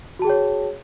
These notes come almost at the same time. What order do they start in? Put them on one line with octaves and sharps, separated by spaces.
F#4 A5 G#4 G5 C#5